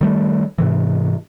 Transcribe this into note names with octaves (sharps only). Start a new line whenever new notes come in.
D#3 G3 A3
G#2 C3 E3